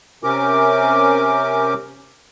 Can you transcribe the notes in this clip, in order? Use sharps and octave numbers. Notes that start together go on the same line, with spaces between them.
C3 C#4 A#4 D6